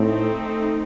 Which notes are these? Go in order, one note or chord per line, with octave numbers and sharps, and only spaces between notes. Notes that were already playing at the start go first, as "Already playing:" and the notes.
Already playing: A2 A3 C4 D#4